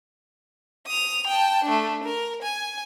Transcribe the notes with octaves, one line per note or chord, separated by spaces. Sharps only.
D#6 F7
G5 A5
A3 D4
A#4
G#5